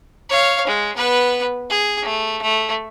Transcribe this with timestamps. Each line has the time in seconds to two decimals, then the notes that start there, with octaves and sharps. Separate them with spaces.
0.29 C#5 F5
0.67 G#3
0.97 B3 B4
1.70 G#4
2.02 A3
2.42 A3